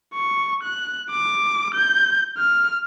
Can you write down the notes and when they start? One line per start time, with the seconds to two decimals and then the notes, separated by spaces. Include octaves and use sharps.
0.14 C#6
0.63 F#6
1.11 D6
1.75 G6
2.38 F6